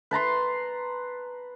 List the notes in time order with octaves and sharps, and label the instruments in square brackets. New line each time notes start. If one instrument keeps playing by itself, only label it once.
[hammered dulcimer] B4 A5 A#5 C6